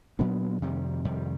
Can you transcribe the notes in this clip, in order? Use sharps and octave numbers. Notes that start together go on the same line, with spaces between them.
A#2 F#3 B3 D4
F2 C3 D#3 G3
F2 C3 D#3 G3